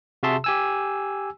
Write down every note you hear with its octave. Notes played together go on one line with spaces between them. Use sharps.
C3 F#4 G#4 E5 A5 C6
G4 G#5 E6